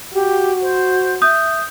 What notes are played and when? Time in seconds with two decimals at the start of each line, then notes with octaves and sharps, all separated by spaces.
0.13 F#4 G4
0.61 C5
1.22 E5 D#6 G6